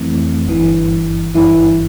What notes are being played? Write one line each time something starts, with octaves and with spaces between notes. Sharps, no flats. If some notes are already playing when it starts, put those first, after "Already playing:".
Already playing: F2 E3 A3 C4
G1 G2 E3
G1 G2 E3 E4